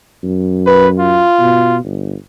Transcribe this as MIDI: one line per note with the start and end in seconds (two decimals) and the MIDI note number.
0.23 1.26 42
0.67 0.88 71
1.00 1.76 65
1.39 1.83 47
1.84 2.15 31